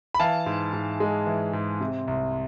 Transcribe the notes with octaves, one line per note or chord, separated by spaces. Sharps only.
B5
E3 F5 A5
G#2
G#2
G#3
E3
G#2
C3
C2